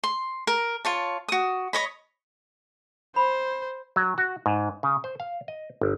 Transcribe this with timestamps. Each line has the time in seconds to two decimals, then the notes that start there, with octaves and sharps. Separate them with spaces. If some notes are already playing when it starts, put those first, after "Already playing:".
0.04 C6
0.47 A#4
0.85 F4 C#5 A5
1.28 F#4 D#6
1.73 C#5 D#5 B5
3.16 C5 B5
3.96 F#3
4.18 F#4
4.46 G#2
4.83 C#3
5.04 C5
5.20 F5
5.48 D#5
5.81 G1